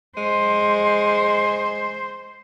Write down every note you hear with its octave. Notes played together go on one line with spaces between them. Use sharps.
G#3 C5